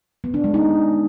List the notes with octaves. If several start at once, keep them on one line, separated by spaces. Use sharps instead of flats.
B3
D4
G#3
D#4